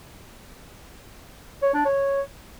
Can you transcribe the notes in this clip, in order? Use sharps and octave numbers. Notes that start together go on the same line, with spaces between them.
C#5
D4
C#5